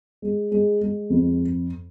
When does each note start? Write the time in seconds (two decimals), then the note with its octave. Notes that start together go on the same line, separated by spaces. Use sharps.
0.22 G#3
0.52 G#3
0.81 G#3
1.10 F2